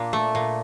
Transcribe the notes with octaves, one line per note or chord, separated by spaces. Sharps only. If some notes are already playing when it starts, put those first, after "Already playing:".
Already playing: A#2 D4
A3
A#2